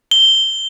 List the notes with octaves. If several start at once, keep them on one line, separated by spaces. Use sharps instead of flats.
G7